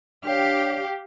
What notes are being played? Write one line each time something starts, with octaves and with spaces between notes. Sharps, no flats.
D4 G4 C#5 F5